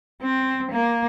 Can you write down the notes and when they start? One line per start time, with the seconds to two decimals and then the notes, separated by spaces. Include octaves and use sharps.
0.22 C4
0.71 A#3